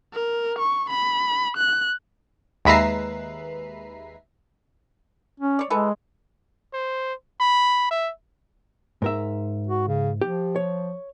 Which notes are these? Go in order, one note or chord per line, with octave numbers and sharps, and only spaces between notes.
A#4
C#6
B5
F#6
D#2 G#3 B4 E5 A#5 C7
C#4
C#5 D5
E3 G#3 A4 B4
C5
B5
E5
G#2 A#4 E5
F#4
C#3
F3 G4
C#5